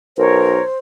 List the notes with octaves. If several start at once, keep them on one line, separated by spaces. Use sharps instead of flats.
B1 A#4 C5 C#5